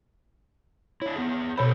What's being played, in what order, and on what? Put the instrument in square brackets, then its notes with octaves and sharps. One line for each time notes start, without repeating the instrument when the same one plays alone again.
[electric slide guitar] D4 E4 [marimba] C#5
[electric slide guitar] B3 G#4
[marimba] B2 C#5 B5 [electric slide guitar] G4 A4 C5